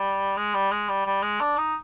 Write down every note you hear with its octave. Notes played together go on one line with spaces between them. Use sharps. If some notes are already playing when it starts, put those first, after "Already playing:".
Already playing: G3
G#3
G3
G#3
G3
G3
G#3
D4
D#4